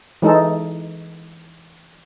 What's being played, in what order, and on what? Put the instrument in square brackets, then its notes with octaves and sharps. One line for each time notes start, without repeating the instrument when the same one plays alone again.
[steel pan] E3 G#3 D#4 A4